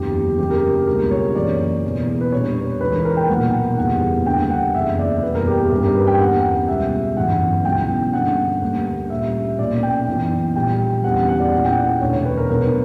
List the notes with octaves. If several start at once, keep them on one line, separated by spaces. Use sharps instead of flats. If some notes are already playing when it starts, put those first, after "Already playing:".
Already playing: F#1 E2 D3 F#3 G4
F#1 F#2 C#3 F#3 G4
A#4
A#4
C#2 B2 G3 A#3 D4 A#4
C#5
F#1 F#2 E3 D5
E1 E2 C#3
B4
A#2 G3 A#3 D4 C#5
C#2 C#3 E3 B4
A#4
A#4
G5
B1 A#2 F#3 A#3 F#5
F#1 E2 C#3 G3 F#5
D2 D3 G3 A#3 G5
F#5
F#1 E2 C#3 E5
D5
F#1 E2 B2 G3 B4
A#4
G4
A#4
G1 G2 D3 G3 C#4 G4
A#4
B4
G5
E2 D3 A#3 C#4 F#5
C#2 B2 G3 E5
G1 F#2 E3 F#5
C#2 B2 F#3 C#4 E4 G5
G2 D3 A#3 C#4 F#5
D2 D3 G3 A#3
A#2 G3 C#4 E5
B1 A#2 A#3 C#4 D5
G5
F#2 E3 B3 E4
A#1 A#2 G3 G5
E2 D3 G3 C#4 F#5
F#5
F#5
D5
A#2 A#3 C#4 E4 F#5
G5
F#5
E1 D2 D3 C#5
C#5
B4
A#4
B1 B2 F#3 B3 D4 A#4
B4